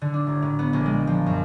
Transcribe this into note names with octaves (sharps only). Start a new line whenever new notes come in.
D3
D4
A1
A2
B3
A#1
G#3
F3
F#2